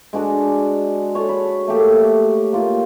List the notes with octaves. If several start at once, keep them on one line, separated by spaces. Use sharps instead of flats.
G#3 D4 F#4 D5
C#5 A5
B5
A3 A#3 G4 A4
A#3 F4